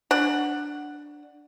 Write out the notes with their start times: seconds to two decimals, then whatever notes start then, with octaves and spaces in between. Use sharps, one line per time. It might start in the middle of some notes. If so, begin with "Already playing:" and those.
0.11 D4 F#5